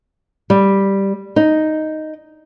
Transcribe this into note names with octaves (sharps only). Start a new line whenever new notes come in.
G3
D#4